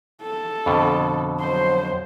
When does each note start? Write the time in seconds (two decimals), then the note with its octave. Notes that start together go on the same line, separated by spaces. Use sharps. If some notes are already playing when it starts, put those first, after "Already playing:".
0.22 A4
0.66 F2 B2 D3
1.41 F#3 C5